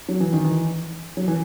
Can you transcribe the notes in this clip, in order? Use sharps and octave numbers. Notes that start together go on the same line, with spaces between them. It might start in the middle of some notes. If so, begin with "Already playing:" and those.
F#3
E3
D#3
E3
F#3
E3